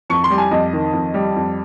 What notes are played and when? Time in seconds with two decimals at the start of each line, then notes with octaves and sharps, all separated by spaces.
0.10 F2 C#6
0.24 C6
0.30 G3
0.38 G#5
0.51 F2 D#5
0.73 D#3
0.93 F2
1.14 G3
1.36 F2